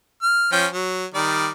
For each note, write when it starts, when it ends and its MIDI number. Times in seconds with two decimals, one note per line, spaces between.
0.22 0.51 89
0.52 0.67 53
0.52 0.67 61
0.52 0.67 79
0.73 1.05 54
1.14 1.49 51
1.14 1.49 55
1.14 1.49 74